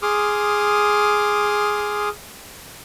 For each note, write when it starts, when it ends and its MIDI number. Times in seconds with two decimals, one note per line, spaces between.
0.02 2.09 68
0.02 2.09 84
0.02 2.09 86
0.02 2.09 87
0.02 2.09 89